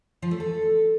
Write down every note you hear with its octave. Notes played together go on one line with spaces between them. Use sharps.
F3
A3
A4